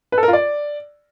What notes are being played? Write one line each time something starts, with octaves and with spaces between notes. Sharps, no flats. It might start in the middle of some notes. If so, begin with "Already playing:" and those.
B4
A4
A#4
F4
D5